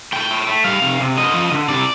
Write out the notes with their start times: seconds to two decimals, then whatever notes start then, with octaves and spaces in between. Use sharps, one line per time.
0.13 A3 G5
0.31 A3
0.47 A3
0.64 G3 F5
0.82 C3
1.00 C3
1.17 D3 D#5
1.34 F3
1.52 D3
1.69 C3 D5